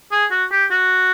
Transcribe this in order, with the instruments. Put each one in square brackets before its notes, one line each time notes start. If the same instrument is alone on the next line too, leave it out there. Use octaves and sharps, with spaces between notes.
[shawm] G#4
F#4
G4
F#4